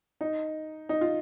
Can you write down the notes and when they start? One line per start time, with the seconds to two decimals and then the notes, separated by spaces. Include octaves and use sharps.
0.21 D#4
0.89 D#4
1.01 F4